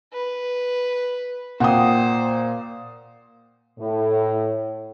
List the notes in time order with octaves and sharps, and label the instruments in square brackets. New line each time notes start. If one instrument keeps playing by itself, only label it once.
[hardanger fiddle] B4
[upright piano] A#2 [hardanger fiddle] C5 [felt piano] F#5 G5 D#6
[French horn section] A2